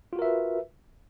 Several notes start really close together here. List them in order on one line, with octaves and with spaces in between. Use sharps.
F4 F#4 A#4 E5 B4